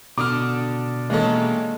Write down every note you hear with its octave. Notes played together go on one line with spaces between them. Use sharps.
B2 D3 D4 D6 D#6 F6
D#3 E3 G#3 A#3 C#4 A4